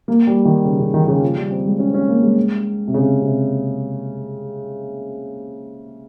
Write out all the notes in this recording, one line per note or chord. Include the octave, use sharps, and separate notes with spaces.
A#3
G3
D#3
C#3
C#3
D#3
D#3
C#3
F3
G3
C4
G#3
C#4
C4
C#4
A#3
G#3
C3
C#3
C3